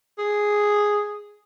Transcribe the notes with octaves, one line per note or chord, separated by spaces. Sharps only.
G#4